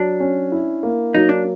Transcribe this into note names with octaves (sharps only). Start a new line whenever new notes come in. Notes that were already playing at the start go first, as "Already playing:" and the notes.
Already playing: F#3 D4
C#4
E4
A#3
F#3 D#4
D4